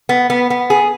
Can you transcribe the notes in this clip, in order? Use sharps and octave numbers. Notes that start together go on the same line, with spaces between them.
B3
B3
B3
G#4